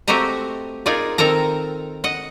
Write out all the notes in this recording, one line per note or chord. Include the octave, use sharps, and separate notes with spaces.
A3 C4 F#4 G4 D#5 A#5
D#4 F4 G#4 A#4 D5
D#3 C4 A4 A#4 A#5
D#5 F#5